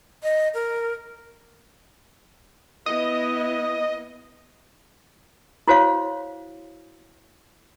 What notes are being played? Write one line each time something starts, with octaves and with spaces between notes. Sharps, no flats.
D#5
A#4
B3 E4 D#5
E4 F#4 C5 C#5 F5